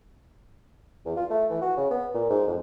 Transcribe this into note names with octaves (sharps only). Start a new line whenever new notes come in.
E2
F4
A3
E3
F#4
C#3
B3
A#2
G#2
F2